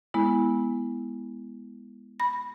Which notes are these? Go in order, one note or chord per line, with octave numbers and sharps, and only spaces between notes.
G#3 B3 E4
B5 A#6